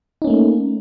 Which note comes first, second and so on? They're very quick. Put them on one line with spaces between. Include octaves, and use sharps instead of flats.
D#4 C#4 A#3 A3